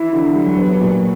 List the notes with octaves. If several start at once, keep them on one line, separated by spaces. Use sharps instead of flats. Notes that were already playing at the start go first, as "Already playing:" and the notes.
Already playing: E3 E4
D3
F#3 G3
B3
A#2